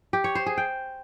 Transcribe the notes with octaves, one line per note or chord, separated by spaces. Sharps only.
G4
C#5
C5
G#4
G5